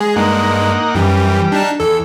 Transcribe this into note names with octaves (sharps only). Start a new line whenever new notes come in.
G#3 G#4
G2 G#3 A#3 D#4 F#5
F#2 E3 G3
D4 D#4 A5
E2 A4